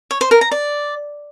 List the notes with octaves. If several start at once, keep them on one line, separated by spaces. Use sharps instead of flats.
C#5
C5
A#4
A#5
D5